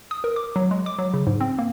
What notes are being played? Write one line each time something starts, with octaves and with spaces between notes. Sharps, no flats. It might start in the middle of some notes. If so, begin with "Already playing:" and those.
D#6
A#4
D6
F#3
G#3
D6
F#3
C#3
G#2
C4
A#3